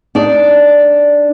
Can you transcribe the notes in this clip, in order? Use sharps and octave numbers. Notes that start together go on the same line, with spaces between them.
D4 D#4 D5